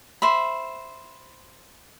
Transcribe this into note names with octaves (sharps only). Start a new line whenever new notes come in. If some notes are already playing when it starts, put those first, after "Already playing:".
C5 E5 B5